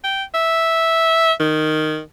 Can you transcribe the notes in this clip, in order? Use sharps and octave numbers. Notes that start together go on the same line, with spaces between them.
G5
E5
D#3